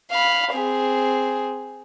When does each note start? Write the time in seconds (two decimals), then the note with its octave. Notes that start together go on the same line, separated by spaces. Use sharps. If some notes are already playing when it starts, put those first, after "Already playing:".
0.11 F5 B5
0.53 C4 G#4